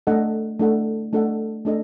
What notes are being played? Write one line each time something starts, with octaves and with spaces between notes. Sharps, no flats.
A3 D4 A4 D#5 F#5
A3 D4 A4 D#5 F#5
A3 D4 A4 D#5 F#5
A3 D4 A4 D#5